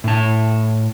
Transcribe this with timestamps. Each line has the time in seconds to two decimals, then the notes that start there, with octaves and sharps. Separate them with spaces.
0.04 A2 A5